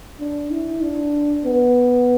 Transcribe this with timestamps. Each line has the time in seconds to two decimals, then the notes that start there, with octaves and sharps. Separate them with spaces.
0.19 D4
0.51 E4
0.82 D4
1.45 B3